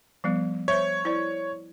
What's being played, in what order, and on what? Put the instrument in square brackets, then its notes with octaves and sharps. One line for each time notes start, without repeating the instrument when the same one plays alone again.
[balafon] F3 G3 B3
[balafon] C5 E5 [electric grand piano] C#5
[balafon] E4 C5 D5